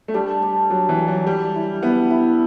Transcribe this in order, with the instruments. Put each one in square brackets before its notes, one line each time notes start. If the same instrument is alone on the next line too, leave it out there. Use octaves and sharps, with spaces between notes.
[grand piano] A3
[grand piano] G3 [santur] D4
[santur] D4
[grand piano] F#3 [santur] D5
[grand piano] E3
[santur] A4
[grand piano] F#3
[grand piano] G3 [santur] D5
[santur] E4
[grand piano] B3 [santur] E4
[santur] E4